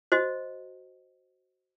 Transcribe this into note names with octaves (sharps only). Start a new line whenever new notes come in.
F#4 C5 D#5